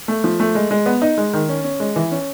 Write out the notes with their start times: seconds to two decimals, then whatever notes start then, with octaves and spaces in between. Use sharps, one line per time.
0.08 A3
0.24 F3
0.40 A3
0.55 G#3
0.71 G#3
0.86 B3
1.02 D#4
1.18 G#3
1.33 D#3
1.49 C#4
1.64 C#4
1.80 G#3
1.96 E3
2.12 C#4